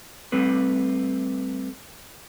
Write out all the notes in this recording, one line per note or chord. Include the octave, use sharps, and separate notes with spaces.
G3 A3 C4 B4